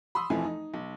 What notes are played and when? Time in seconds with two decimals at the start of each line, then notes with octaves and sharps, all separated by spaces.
0.15 B5 C6 D#6 E6
0.30 F1 F2 E3 F3 E4 G#5
0.44 D#4
0.74 B1